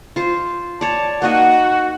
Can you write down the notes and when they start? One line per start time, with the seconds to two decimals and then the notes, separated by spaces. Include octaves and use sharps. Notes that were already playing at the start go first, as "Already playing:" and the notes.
0.16 F4 C5
0.81 C#5 D5 A5
1.22 A#3 D#4 F#4 D#5 F#5